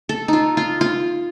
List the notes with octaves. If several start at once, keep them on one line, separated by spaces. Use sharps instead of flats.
A4
D#4 F4
F4
F4